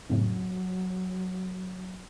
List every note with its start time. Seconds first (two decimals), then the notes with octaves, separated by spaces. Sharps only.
0.09 F2 A2 C#3 F#3